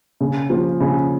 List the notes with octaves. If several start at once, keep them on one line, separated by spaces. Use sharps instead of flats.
C#3
F3
C#3